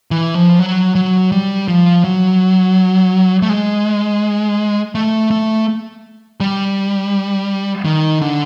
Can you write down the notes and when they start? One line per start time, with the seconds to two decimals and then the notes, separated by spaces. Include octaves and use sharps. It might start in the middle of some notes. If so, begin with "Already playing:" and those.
0.11 E3
0.35 F3
0.59 F#3
0.95 F#3
1.32 G3
1.68 F3
2.04 F#3
3.42 A3
3.49 G#3
4.95 A3
5.30 A3
6.40 G3
7.85 D#3
8.22 D3